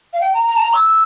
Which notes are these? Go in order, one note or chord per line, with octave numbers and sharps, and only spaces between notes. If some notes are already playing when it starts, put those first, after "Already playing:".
F5
G5
A#5
A#5
A5
A#5
E6